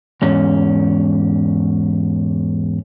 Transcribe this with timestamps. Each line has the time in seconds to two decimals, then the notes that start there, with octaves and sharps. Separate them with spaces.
0.22 E2 G#2 C#4